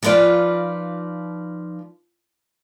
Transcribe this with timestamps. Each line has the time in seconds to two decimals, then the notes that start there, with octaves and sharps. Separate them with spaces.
0.03 F3 D#4 F4 B4 D5